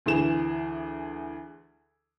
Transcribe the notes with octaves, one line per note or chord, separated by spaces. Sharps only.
D2 E3 G#4 E7